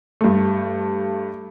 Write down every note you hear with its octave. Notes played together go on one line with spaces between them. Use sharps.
G2 A3